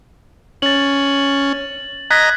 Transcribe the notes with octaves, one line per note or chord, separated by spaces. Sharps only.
C#4 A6 F#7
D#5 A#5 F#6 G#6 B6